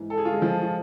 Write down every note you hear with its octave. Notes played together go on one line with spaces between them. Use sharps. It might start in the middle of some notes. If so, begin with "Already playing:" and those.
Already playing: G#2 E3
A4
G#4
F4
G#3 G#4
F3 F4
F4